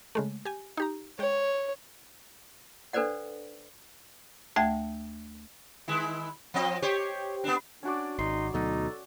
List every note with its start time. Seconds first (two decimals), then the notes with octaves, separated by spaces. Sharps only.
0.15 C#3 G#3 A3
0.45 G4 G#5
0.77 D#4 G4 A#5
1.19 G#3 C#5 G5
2.93 D4 A4 B4 C5 D5 F#5
4.56 D2 A3 E5 G5 A5 G#6
5.88 D#3 G#3 E4
6.54 F3 C4 D#5
6.82 G4 C5 C#5
7.44 B3 C4 D4
7.83 C#4 D4 F#4 D5
8.19 G#1 D#4 C6
8.54 D2 B2 F#3 D#4 A4